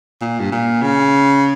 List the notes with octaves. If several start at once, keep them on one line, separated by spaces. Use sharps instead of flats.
A#2
G2
A#2
C#3